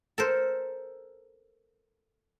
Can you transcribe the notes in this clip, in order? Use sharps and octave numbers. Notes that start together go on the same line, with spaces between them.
A4 A#4 C5